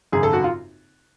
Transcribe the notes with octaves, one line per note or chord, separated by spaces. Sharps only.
G#1 F#2 C#3 G#4
A4
F#4
F4